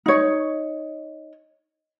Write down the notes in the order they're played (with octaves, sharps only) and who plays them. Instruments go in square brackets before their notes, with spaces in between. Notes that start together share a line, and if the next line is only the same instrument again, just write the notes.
[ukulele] D#4 C#5